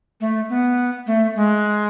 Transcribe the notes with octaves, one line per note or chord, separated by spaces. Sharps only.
A3
B3
A3
G#3